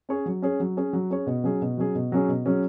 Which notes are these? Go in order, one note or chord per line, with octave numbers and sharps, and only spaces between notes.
C#4 G#4 C#5
F#3
C#4 G#4 C#5
F#3
C#4 G#4 C#5
F#3
C#4 G#4 C#5
B2
F#3 C#4 G#4
B2
F#3 C#4 G#4
B2
F#3 C#4 G#4
B2
F#3 C#4 G#4